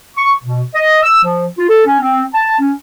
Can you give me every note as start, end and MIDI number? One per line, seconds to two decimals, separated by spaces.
0.17 0.33 85
0.43 0.63 47
0.74 1.02 75
1.02 1.22 88
1.23 1.46 53
1.58 1.65 65
1.69 1.84 69
1.86 1.99 61
2.01 2.23 60
2.33 2.55 81
2.60 2.73 61